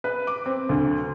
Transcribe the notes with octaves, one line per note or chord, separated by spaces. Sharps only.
B4
D6
C4
D2